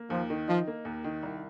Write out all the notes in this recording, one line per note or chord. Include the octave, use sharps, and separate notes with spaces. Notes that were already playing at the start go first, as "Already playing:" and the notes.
Already playing: A#3
D#2 F3
D#3
F3 D#4
A#3
D#2
D#3
C2